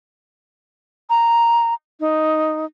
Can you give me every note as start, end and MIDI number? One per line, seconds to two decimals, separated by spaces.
1.10 1.74 82
2.00 2.65 63